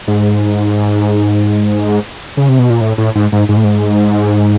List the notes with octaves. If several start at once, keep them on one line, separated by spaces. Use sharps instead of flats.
G#2
C#3
C3
B2
A#2
A2
A2
G#2
G#2
G#2
A2
G#2